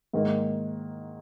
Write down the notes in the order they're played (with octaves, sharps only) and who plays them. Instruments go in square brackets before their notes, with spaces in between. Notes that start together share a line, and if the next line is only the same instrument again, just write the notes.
[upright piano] G#2 D#3 A#3